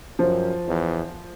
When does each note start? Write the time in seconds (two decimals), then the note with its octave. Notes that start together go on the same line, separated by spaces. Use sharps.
0.19 F#2 F3
0.68 E2